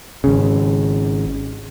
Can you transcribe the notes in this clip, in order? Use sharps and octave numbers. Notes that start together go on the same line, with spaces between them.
G#1 C#3